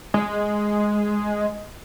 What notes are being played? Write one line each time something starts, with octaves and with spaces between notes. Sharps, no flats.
G#3